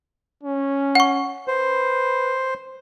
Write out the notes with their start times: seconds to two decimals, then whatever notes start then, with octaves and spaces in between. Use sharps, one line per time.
0.43 C#4
0.95 F#5 C#6
1.48 B4 C5